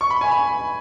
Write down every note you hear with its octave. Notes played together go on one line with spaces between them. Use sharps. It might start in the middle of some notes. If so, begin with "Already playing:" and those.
C#6
B5
G#5
B5